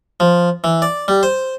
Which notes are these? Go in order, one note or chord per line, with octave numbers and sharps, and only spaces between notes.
F3
E3
D5
G3
C5